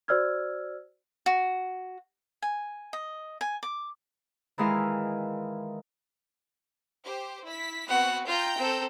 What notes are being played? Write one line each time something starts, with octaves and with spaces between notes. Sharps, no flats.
F#4 C5 D5 E6 F6 G#6
F#4
G#5
D#5
G#5
D6
D#3 E3 G#3 E4 F5
G4 C5
E4 B6
B3 C4 F#4 F#5
F4 G5 A#5 G6
C4 A4